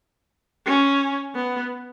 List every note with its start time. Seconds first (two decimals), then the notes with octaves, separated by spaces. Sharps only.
0.66 C#4
1.35 B3